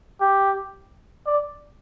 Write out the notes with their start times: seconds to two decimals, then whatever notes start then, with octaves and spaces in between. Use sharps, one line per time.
0.21 G4
1.26 D5